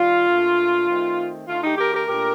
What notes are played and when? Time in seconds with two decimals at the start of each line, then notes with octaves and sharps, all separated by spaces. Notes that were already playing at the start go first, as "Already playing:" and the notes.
Already playing: D#3 G3 F4
0.27 A#2 A3 D4
0.87 D#3 A3 C4 D#4
1.48 D3 A3 D#4 F4
1.63 D#4 G4
1.78 G4 A#4
1.93 G4 A#4
2.08 A#2 A3 D4 G4 A#4